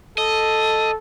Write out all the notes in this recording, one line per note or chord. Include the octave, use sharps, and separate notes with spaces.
A4 D#5